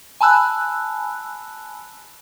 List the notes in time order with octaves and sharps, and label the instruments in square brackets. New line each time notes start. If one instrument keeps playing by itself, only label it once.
[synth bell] G#5 A5 B5 E6 F#6